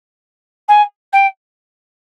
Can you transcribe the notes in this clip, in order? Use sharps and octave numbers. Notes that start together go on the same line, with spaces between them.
G#5
G5